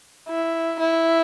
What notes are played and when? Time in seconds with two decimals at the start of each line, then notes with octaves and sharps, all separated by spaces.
0.29 E4
0.80 E4